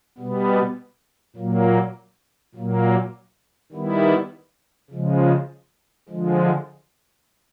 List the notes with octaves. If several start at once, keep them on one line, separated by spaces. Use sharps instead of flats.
B2 G3 B3
A#2 F#3 A#3
A#2 F#3 A#3
D#3 G3 B3 E4
C#3 F3 G#3
D3 F3 G#3